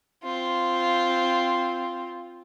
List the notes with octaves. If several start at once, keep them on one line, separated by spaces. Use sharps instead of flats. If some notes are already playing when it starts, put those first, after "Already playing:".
C4 F4